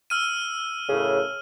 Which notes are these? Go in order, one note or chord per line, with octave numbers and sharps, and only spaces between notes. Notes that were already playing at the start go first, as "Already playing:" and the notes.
E6 F6 D#7
F#2 A2 C#3